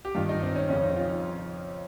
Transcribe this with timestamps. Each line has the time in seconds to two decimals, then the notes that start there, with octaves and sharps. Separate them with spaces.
0.05 G4
0.15 G2 D#3 F4
0.29 D#4
0.43 C4
0.56 C#4
0.69 F2 C#3 C#4
0.82 D#4
0.96 F4